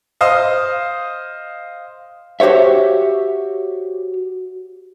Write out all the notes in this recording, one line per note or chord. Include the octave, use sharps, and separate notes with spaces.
C5 D#5 F5 D#6
F#4 G4 C5 C#5 E5